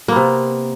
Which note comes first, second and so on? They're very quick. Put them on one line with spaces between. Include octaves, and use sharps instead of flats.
A#3 B3 C3